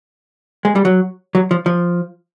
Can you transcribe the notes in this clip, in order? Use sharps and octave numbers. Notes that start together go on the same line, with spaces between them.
G#3
G3
F#3
F#3
F3
F3